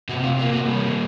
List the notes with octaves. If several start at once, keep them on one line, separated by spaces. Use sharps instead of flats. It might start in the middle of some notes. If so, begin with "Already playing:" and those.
C3 F#4
F4
A#3 F4
F#4
G3